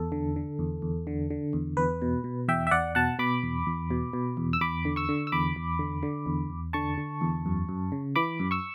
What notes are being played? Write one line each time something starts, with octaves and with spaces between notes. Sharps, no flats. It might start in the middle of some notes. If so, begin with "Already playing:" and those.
Already playing: E2 A4
D3
D3
E2
E2
D3
D3
E2
E2 B4
B2
B2
E2 E5 G5
E5
E2 D5 F#5
B2 F#5 A5
B2 B5 D6
E2
E2
B2
B2
E2
E6
E2 B5 D6
D3
C#6 E6
D3
E6
E2 B5 D6
E2
D3
D3
E2
E2
D3 A5 C#6
D3
E2
F#2
F#2
C#3
E3 B5 D6
F#2
C#6 E6